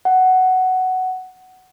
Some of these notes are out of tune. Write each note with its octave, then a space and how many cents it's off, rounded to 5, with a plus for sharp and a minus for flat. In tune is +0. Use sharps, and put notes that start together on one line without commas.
F#5 +10